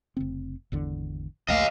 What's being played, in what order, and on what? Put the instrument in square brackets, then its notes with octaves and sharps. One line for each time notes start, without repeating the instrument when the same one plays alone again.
[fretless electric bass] F1 C#3 C4
G#1 E2 D3
[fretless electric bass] A#1 D#2 A3 [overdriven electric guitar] D#5 F5